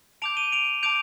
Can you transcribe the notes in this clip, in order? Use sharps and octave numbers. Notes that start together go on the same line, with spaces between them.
A5 D6 G6 D7 F7
D#7 G7
D7 F7
A5 D6 G6 D7 F7